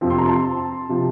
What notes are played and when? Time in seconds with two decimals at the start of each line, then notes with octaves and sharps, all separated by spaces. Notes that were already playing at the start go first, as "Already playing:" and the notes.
0.01 F2 C3 F3 C4
0.10 C6
0.18 A#5
0.27 A5 C6
0.89 C3 F3 C4